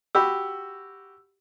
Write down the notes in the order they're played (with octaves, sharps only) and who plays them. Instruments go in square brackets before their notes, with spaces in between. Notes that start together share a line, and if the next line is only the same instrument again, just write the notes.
[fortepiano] F#4 G4 B5 [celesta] E6